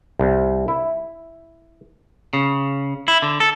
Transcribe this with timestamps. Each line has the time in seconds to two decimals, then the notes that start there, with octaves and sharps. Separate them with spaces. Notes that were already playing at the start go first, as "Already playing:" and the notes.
0.20 C2
0.68 E4
2.33 C#3
3.08 E4
3.22 D3
3.40 A4